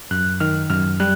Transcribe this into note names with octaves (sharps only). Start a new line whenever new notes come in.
F#2 F#6
D#3 F6
F#2 F6
G3 F#6